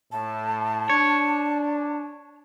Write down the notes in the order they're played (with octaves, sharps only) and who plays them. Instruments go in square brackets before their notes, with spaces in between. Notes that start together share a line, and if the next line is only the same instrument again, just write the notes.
[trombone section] A2 [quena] A5
[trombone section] D4 [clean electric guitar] C#5